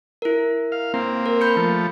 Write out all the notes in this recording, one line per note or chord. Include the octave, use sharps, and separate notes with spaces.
E4 A#4
F5
A#3 C4
A#4
B5 G6 C#7
F3 A3